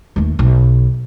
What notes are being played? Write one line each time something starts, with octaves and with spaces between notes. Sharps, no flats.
D#2 A3
B1